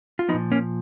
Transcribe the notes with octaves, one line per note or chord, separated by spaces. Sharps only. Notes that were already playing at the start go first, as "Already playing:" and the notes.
F4
F3 B3 D#4
A#2
A#3 C#4